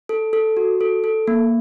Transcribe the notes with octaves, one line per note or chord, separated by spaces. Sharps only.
A4
A4
F#4
A4
A4
A#3